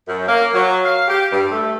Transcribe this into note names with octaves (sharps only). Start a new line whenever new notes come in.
F#2
A#3
F#3
F5
G4
G2
A3